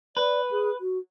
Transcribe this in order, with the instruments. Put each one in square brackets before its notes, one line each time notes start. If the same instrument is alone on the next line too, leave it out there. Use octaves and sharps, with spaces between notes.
[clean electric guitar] B4 [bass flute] D5
[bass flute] G#4
F#4